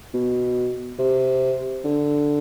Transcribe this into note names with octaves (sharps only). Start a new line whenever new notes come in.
B2
C3
D3